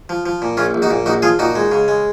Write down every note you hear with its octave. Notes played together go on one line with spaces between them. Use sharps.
F3
F3
A#2
A#1 C#4 F4
A#1
D#4 F#4
A#2
A#1 D#4 F#4
F3 F4 G#4
A#2 D#4 F#4
G#3
C#3
G#3